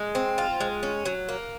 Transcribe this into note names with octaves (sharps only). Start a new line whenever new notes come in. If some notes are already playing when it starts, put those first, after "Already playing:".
Already playing: G#3
C4
F4
G#3
C#4
F#3
A#3